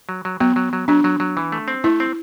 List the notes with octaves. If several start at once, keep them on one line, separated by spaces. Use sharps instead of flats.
F#3
F#3
F#3 B3
F#3
F#3
F#3 D4
F#3
F#3
E3
A3
C4
A3 E4
C4